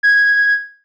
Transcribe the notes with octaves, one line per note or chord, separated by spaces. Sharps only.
G#6